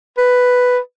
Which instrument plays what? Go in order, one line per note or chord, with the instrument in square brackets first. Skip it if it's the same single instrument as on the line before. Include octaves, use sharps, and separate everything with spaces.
[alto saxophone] B4